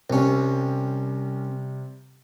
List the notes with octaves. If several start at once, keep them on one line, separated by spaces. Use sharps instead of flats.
C2 C3 G3 C#4